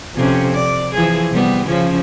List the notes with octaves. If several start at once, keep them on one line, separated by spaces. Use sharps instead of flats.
F2 C3 C#4
D5
E3 F3 G#4
C3 G3 B3
C#3 F3 C#4